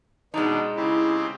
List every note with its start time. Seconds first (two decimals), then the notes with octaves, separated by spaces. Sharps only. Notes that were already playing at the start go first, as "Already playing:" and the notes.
0.34 B2 G#3 D4 D#4
0.76 C#3 C4 E4 G4